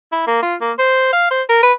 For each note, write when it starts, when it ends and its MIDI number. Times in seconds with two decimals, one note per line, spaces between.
0.12 0.23 64
0.27 0.40 58
0.42 0.55 65
0.61 0.72 58
0.79 1.08 72
1.13 1.31 77
1.31 1.42 72
1.49 1.59 70
1.63 1.73 71